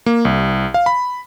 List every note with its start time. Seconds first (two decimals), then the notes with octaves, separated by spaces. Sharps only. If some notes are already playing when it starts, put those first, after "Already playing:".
0.06 A#3
0.25 C2
0.74 F5
0.86 B5